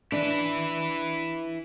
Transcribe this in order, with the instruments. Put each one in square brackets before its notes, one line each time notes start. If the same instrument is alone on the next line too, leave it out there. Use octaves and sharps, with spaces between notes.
[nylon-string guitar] D4 [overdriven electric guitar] E4 B4